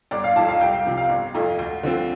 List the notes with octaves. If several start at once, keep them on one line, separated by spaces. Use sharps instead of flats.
G1 D5
F5
F2 F3 A5
F5
C2 G5
F5
C3 F3
F5
G1
F2 F3 A3
D2
D3 F3 C4